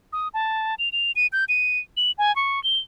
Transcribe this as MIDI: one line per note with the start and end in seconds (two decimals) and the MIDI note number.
0.13 0.28 87
0.34 0.75 81
0.79 0.89 101
0.92 1.12 101
1.16 1.27 99
1.33 1.45 91
1.49 1.79 99
1.97 2.12 102
2.18 2.34 80
2.36 2.62 85
2.64 2.78 103